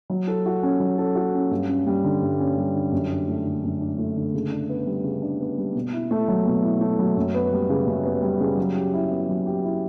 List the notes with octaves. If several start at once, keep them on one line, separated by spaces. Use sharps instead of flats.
F#3
A4
F#4
C#4
F#3
A4
F#4
C#4
G2
C#4
G3
D3
G2
C#4
G3
D3
F#2
D4
A3
D3
F#2
D4
A3
D3
C#3
D4
B3
G3
C#3
D4
B3
G3
B2
E4
A3
F#3
B2
E4
A3
F#3
F#2
B3
G3
C#3
F#2
B3
G3
C#3
F#3
G4
E4
B3
F#3
G4
E4